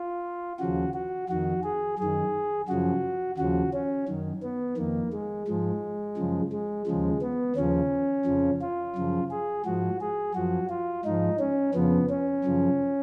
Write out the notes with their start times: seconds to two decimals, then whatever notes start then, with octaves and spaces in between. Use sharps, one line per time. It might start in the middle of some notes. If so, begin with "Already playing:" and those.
Already playing: F4
0.59 D#2 C#3 F3 F#4
0.94 F#4
1.29 F2 D#3 F#4
1.63 G#4
1.99 F#2 D#3 G#4
2.68 F#2 C#3 F3 F#4
3.37 D#2 C#3 F3 F#4
3.74 C#4
4.08 F#2 D#3
4.43 B3
4.77 F2 D#3 A#3
5.13 G#3
5.47 G#2 F3 G#3
6.17 F#2 C#3 F3
6.52 G#3
6.86 D#2 C#3 F3 G#3
7.22 B3
7.56 D#2 C#3 F3 C#4
8.26 F2 C#3 F3
8.61 F4
8.96 F#2 C#3 F3
9.31 G#4
9.65 G#2 F3 F#4
10.01 G#4
10.34 F#2 F3 F#4
10.70 F4
11.05 G#2 F3 D#4
11.39 C#4
11.74 F2 C#3 F3 B3
12.10 C#4
12.44 F#2 C#3 F3